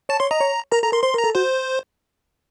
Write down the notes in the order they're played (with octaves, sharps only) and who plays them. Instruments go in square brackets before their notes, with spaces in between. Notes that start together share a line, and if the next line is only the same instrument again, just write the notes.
[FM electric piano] C#5 [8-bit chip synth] A5
[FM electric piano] C#5 [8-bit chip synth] C6
[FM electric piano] D#5 [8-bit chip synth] A#5
[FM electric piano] C#5
[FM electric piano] A#4 [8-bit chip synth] A#5
[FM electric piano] A4 [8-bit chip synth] A#5
[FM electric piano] A#4 [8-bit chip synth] C6
[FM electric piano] C5 [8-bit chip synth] C6
[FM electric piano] A#4 [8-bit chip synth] A#5
[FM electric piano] A4
[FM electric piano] F#4 [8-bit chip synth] C5